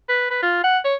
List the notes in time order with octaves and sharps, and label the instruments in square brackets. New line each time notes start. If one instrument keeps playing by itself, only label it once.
[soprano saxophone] B4
B4
F4
F#5
C#5